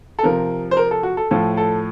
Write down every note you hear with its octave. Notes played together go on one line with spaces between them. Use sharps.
A4
C3 F3 A#4
C5
A#4
A4
F#4
A4
A2 F3 A4
A4